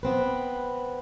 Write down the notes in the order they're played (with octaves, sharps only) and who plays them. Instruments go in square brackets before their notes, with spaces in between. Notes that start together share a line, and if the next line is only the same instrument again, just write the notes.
[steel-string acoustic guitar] B3 C4 B4